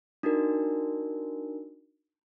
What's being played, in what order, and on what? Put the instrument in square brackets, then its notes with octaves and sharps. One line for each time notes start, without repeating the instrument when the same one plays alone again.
[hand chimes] D4 D#4 F#4 A#4